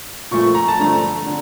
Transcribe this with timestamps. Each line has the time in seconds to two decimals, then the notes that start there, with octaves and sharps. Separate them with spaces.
0.31 A#2 F3 A3 C#6
0.55 A#5
0.68 A5
0.79 G2 D3 F3 A3 A#5
1.26 D3